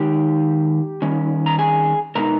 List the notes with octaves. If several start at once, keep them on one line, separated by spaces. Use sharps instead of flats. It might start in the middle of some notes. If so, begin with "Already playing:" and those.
Already playing: D#3 G#3 D#4 G4 G5
D#3 G3 C#4
A#5
G#4 G#5
B2 G#3 B3 D#4 A#4 A#5